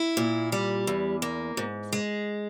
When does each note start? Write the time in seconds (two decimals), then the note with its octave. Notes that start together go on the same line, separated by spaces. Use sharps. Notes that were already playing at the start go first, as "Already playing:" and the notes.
Already playing: E4
0.17 A#2
0.52 G3
0.87 E2
1.22 A#3
1.57 G#2
1.93 G#3